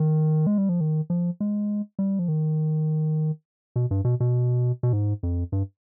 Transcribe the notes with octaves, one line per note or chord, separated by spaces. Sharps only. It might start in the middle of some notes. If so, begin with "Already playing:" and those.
Already playing: D#3
G#3
G3
F3
D#3
F3
G#3
G3
F3
D#3
B2
G2
B2
B2
B2
G#2
F2
G2